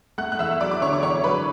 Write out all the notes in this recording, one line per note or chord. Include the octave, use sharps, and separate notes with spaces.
A3 F#5 F#6
F#6
E2 E5 E6
F#3 D5 D6
D6
D3 C#5 C#6
D6
E2 C#5 C#6
F#3 B4 B5